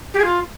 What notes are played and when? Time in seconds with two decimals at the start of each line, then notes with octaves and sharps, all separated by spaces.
0.14 G4
0.19 G#4
0.24 F4